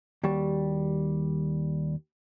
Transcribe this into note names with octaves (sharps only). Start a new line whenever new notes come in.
D#2 G3 F#4 G4 A5